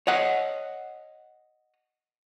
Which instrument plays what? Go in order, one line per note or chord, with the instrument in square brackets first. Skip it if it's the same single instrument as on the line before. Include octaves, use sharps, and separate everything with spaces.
[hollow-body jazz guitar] C#5 D#5 F#5